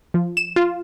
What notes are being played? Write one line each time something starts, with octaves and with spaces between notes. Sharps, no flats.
F3
E7
F4